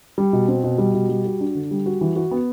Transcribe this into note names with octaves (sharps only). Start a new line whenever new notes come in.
G3
B2
C4
B2
G3
B2
G3
F#4
D4
D3
G3
F#4
E3
F#4
B3